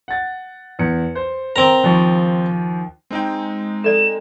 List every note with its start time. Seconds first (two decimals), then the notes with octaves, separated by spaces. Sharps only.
0.08 F#5 A6
0.79 E2 C#7
1.15 C5
1.56 C4 A#4 A#5
1.84 D#2 F3 C#6
3.11 G#3 C4 D#4 G5
3.84 A4 D5 E7